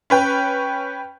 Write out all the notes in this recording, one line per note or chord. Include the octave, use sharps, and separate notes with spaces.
C#4 B4 G5